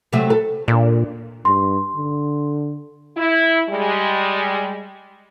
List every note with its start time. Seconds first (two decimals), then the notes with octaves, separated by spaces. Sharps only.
0.13 C3 F#3 A3
0.30 A4
0.68 A#2 D4
1.45 G2 C6
1.96 D3
3.17 E4
3.69 G3 G#3